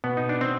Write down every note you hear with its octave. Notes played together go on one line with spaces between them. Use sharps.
B2 B3
D#4
D4
C4